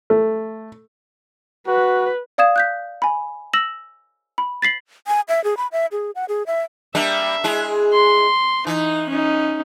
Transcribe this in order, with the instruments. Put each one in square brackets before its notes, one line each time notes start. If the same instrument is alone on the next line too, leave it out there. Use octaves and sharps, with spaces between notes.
[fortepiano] A3
[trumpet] F#4 [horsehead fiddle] B4
[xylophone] D5 F5 D#6 G#6 E7
F#6 G6 B6
G#5 B5
E6 A#6 E7 F#7
B5
A6 B6 C7 F#7
[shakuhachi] G#5
E5
G#4
B5
E5
G#4
F#5
G#4
E5
[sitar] G3 A#3 D4 [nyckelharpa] E5
[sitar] G#3 E4 G#4
[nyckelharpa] C6
[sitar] E3 [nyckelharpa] D#4
[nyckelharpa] C#4 D#4